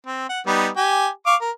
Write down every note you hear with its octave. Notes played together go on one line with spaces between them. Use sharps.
C4
F#5
G3 B3 D#4
G4 G#5
F5 C#6 D6
A#4